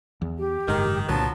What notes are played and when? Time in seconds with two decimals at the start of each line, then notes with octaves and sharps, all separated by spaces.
0.22 E2
0.38 G4
0.68 F#1 G#2 D#3
1.09 C2 A#2 D3 F3 F#3 B3 A5